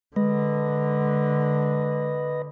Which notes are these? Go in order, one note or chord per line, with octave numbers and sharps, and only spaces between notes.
D3 G#3 B4 D#5